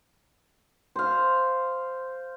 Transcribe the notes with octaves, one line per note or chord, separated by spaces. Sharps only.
C5 F5